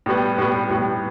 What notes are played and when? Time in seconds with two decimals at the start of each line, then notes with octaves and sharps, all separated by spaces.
0.06 A2 G3 B3
0.38 A2 G3 B3
0.70 A2 G3 B3